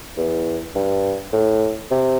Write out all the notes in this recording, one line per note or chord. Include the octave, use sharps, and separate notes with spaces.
E2
G2
A2
C3